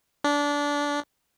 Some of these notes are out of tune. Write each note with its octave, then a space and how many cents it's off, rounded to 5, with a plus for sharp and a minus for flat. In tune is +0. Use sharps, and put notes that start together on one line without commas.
D4 -20